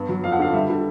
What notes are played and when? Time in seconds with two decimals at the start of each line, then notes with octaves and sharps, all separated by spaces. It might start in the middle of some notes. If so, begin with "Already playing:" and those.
Already playing: G2 B3
0.09 F#3
0.24 F2 F5
0.32 F#5
0.39 D3 F5
0.54 G3 E5
0.70 D3